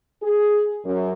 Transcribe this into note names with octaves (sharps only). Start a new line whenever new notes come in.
G#4
F#2